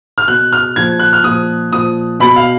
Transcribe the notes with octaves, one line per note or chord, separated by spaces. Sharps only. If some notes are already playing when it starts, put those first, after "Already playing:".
F6
B2 F#6
F6
A#2 F3 G#6
F#6
F6
A#2 F3 D#6
A#2 F3 D#6
B2 B5
F5